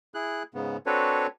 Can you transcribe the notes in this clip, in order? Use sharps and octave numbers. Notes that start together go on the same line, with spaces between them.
E4 G#4 F#6
G#2 C#3 B3
C4 D4 F#4 A4 B4 C#5